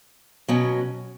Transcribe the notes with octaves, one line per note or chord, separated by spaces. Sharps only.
B2 F#3 C#4